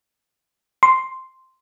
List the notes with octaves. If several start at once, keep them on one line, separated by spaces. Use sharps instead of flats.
C6